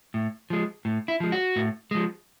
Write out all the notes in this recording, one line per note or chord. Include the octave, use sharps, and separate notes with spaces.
A2
F3 G#3
A2
E4
F3 G#3
F#4
A2
F3 G#3